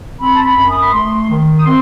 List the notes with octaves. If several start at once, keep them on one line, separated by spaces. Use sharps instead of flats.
C4 B5
A5
B5
F#2
D#6
B5
A3 C6
D#3
D#6
C4 C6